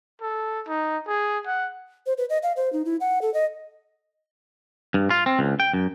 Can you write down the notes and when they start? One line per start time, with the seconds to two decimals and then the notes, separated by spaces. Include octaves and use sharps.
0.22 A4
0.68 D#4
1.07 G#4
1.46 F#5
2.06 C5
2.18 B4
2.30 D#5
2.43 F5
2.57 C5
2.73 D#4
2.85 E4
3.00 F#5
3.22 A4
3.34 D#5
4.94 G2
5.10 F4
5.26 C4
5.39 C#2
5.60 G5
5.73 F#2